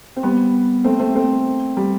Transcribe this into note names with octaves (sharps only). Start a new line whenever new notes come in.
C4
G3 B3
A3 C4
A3 C4
A3 C4
G3